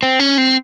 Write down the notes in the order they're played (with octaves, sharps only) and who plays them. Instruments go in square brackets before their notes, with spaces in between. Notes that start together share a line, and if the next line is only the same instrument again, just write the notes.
[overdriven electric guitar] C4
C#4
C4